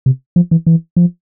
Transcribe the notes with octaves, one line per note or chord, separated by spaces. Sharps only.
C3
F3
E3
E3
F3